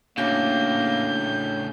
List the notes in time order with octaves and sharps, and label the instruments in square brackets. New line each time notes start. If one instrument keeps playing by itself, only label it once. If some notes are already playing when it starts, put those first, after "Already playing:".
[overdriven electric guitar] A2 C#3 [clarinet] A#3 [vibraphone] D4 F#4 C#5 [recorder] G6